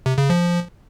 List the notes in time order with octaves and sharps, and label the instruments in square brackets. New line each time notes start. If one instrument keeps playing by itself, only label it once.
[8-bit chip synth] C3
C#3
F3